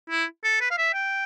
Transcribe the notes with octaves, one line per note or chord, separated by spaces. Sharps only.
E4
A4
B4
F5
E5
G5